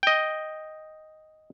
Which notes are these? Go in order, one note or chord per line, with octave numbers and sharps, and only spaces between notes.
D#5 G5